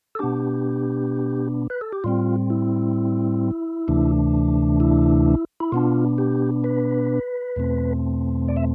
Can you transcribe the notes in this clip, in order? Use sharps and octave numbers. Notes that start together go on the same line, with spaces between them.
A4
B2 B3 D4 G4
B4
A4
G4
A2 G3 C4 F4
E4
D2 C3 E3 A3 D4
E4
E4
B2 B3 D4 F4
G4
B4
E2 B2 A3 C4
D5
E5